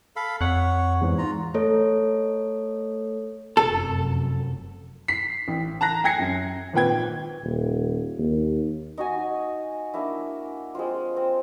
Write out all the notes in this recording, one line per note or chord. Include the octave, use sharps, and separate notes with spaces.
A4 F5 B5
F2 C#5 F#5 F#6
E2 G#2
F4 A#5
A3 A4 C#5
F1 F#2 A4
B6 C7
A1
A5 A#5 F#6 A#6
G5 G#5 G#6 A#6 C7 C#7
F#2
G#1 A#2 B4 G5 G#6
D#1
D#2
D#4 F#4 G#5
A#3 D4 E4
G#3 C4 F4
C4